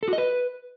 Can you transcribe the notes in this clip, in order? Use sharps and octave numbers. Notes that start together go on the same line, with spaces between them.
A4
F#4
D#5
B4